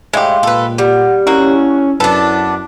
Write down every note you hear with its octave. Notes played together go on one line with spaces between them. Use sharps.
A2 G#3 G4 F5 C6
A#2 A4 B4
G3 F#5
A#3 C#4 E4 F#4
F#2 B3 D4 A4